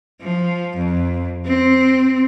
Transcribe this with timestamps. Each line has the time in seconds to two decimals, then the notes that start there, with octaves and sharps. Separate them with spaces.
0.21 F3
0.77 F2
1.46 C4